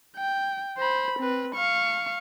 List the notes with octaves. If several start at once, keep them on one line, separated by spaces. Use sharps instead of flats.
G5
C5 B5
C4 B4
F5 C#6